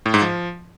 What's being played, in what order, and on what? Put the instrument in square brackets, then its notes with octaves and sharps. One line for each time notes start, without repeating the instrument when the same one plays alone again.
[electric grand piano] A2
G#2
F3